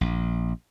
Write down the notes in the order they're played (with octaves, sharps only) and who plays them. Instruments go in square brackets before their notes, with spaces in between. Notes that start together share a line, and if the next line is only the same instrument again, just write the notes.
[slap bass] A#1